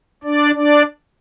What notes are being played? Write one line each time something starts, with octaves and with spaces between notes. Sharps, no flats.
D4 D5
D4 D5